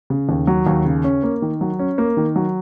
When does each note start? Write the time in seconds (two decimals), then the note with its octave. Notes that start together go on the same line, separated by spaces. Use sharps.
0.10 C#3
0.29 D#2
0.47 F#3
0.67 D#2
0.85 C#3
1.04 C#4
1.23 A#3
1.42 D#3
1.61 F#3
1.79 C#4
1.98 A#3
2.17 D#3
2.36 F#3